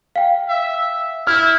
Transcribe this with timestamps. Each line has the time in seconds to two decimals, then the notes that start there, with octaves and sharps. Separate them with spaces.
0.16 F5 G5
0.49 E5
1.27 E4 F6